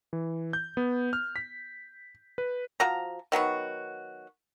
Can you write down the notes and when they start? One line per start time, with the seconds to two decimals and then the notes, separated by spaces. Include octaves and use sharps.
0.13 E3
0.53 G6
0.77 B3
1.13 F6
1.36 B6
2.38 B4
2.80 F3 F#4 A#5
3.32 D#3 F#3 B3 F#4